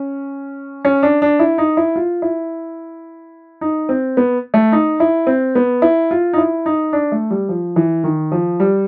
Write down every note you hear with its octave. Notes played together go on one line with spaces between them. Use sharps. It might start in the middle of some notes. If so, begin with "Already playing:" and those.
Already playing: C#4
C#4
D4
D4
E4
D#4
E4
F4
E4
D#4
C4
B3
A3
D#4
E4
C4
B3
E4
F4
D#4
E4
D#4
D4
A3
G3
F3
E3
D#3
F3
G3